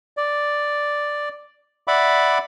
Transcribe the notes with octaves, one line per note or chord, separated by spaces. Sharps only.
D5
D5 E5 F#5 B5 D6